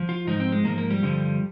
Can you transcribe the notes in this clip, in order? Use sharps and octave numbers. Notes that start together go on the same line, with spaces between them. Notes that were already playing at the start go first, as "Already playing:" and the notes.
Already playing: F3
F4
G#2 F3 D#4
C4
G#3
G#2 F3 A#3
A#3
G3
G2 D3 F3